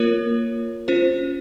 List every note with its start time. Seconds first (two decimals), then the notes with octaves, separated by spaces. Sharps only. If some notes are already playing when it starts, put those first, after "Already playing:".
Already playing: A#3 F4 A#4 C#5
0.88 C#4 F4 C5